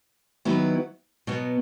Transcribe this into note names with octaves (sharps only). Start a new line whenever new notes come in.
D#3 F#3 B3 E4 B4
B2 F#3 B3